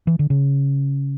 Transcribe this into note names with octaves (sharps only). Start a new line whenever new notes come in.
E3
D3
C#3